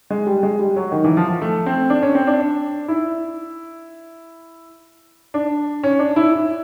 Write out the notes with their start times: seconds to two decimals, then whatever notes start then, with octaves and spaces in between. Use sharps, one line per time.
0.10 G#3
0.27 G3
0.43 G#3
0.59 G3
0.76 F#3
0.92 D#3
1.04 E3
1.17 F3
1.28 F3
1.41 A3
1.66 C4
1.90 D4
2.03 C#4
2.15 C4
2.27 D4
2.88 E4
5.34 D4
5.83 C#4
5.99 D4
6.16 E4
6.32 E4